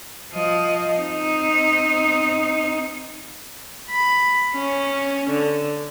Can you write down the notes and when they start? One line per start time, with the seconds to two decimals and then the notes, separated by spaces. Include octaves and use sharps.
0.33 F3 D#5
0.99 C4 D#4
3.91 B5
4.55 C#4
5.30 D3